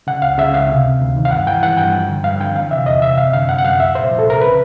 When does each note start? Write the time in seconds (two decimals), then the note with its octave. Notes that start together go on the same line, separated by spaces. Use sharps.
0.07 C#3 F#5
0.22 C#2 F5
0.38 C#3 E5
0.54 C#2 F5
0.69 C3
0.85 D2
1.00 D2
1.16 D#3
1.25 F5
1.31 G2 F#5
1.47 E3 G5
1.62 E3 F#5
1.78 G2 G5
1.94 F3
2.09 D3
2.24 G2 F5
2.40 D3 G5
2.55 E3 F5
2.71 C3 E5
2.86 E2 D#5
3.02 C3 E5
3.18 F#2 F5
3.33 D3 F5
3.48 F#2 F#5
3.59 F#5
3.65 F#2 F5
3.79 C2 E5
3.95 A#2 C5
4.11 F3
4.19 A4
4.27 C2 A#4
4.42 C#3 B4